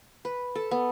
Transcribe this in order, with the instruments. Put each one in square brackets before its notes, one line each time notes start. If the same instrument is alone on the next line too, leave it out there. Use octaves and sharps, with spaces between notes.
[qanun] B4
A4
B3